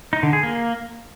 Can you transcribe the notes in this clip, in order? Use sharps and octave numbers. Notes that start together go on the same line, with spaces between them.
D#4
D3
G#4
A#3